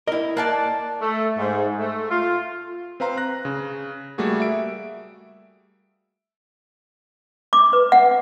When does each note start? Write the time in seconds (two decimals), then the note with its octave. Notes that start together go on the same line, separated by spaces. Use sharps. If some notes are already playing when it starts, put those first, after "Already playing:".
0.07 E4 A#4 D#5
0.37 A#3 D5 A5 F#6
1.01 A3
1.38 G#2
1.79 A3
2.10 F4
3.00 C4 B4 F5 A#5 C6
3.18 F#6 A#6
3.45 C#3
4.18 G3 A3 A#3 F#4 G#4
4.40 E5 D7
7.53 D6
7.73 B4
7.92 F#5